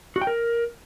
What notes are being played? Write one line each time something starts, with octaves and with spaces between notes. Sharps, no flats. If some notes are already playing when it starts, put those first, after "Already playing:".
F#4
G5
A#4